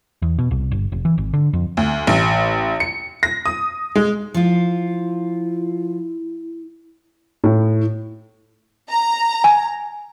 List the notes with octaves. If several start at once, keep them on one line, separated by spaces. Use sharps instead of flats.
E2
B2
C2
G1
F1
E3
G#1
D3
F2
D2
A1
C#7
A#6
D#6
G#3
F3 E4 F4
A2
A#5
G#5